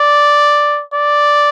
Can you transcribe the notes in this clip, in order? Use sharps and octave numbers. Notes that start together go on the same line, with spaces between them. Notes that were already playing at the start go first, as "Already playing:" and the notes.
Already playing: D5
D5